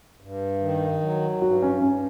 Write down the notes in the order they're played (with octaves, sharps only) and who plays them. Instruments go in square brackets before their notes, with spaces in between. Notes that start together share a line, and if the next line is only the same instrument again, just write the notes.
[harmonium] G2
D#3
F#3
[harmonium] G2 [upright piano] F#4
[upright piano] C#4
[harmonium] G2 [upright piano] C#4